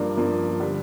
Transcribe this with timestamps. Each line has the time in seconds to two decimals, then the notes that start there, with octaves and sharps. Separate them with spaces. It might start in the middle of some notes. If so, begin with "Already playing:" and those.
Already playing: G2 F3 A#3 D4
0.17 G2 F3 A#3 D4
0.60 D3 G3 D4